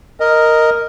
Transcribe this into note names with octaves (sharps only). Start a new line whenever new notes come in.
A#4 D#5